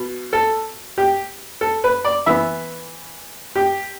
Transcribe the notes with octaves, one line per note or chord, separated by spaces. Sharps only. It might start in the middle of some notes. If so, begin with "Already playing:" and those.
Already playing: B2
A4
G4
A4
B4
D5
E3 B3 E5
G4